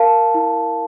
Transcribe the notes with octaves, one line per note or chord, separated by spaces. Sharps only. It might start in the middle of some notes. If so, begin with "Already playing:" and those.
Already playing: A#4 F5 A5
E4